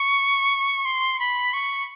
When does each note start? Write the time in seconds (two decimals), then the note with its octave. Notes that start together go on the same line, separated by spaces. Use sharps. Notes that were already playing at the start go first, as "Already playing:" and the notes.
Already playing: C#6
0.85 C6
1.19 B5
1.53 C#6